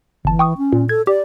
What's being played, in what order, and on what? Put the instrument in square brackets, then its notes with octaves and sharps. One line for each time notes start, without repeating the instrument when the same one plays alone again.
[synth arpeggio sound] G1 A5 [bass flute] E3
[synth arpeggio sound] G5 C#6 D#6
[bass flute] C#4
[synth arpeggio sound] A#2
[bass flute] A4 [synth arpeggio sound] G#6
[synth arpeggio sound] G4 [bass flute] D5